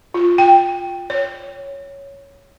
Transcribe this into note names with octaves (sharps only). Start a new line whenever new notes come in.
F4
G5
C#5